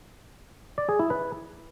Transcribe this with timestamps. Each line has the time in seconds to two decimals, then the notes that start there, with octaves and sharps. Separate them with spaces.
0.78 D5
0.89 G#4
0.99 E4
1.10 B4